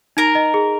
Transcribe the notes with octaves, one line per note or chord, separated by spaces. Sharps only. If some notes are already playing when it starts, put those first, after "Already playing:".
D#4 A#4 A#5
D#5
G#4